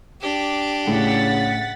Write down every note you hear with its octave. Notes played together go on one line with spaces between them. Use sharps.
D4 G4
A2 C#3 F#5 A6 B6